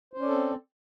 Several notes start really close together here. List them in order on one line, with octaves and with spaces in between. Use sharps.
C5 C#4 D5 A4 C4